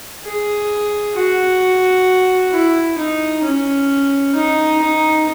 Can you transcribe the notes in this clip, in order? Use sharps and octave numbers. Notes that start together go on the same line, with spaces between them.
G#4
F#4
E4
D#4
C#4
D#4
D#4